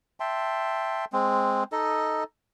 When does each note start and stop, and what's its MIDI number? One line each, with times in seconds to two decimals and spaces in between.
0.20 1.05 76
0.20 1.05 79
0.20 1.05 81
0.20 1.05 84
1.13 1.64 56
1.13 1.64 60
1.72 2.24 63
1.72 2.24 69
1.72 2.24 75